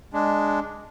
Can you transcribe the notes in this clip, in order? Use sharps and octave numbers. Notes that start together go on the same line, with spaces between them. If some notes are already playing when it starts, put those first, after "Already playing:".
G#3 D4